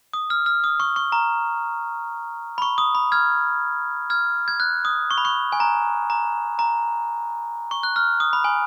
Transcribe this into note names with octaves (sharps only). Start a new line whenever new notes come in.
D#6
F6
F6
D#6
C#6
C#6
A#5
B5
C#6
D#6
B5
F6 G#6
F6 G#6
G#6
F#6
D#6
C#6
B5
C#6
G#5
A#5
A#5
A#5
C#6
F#6
F6
D#6
B5
G#5